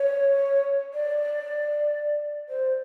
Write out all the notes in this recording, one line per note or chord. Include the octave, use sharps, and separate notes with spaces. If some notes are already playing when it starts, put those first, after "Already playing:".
Already playing: C#5
D5
C5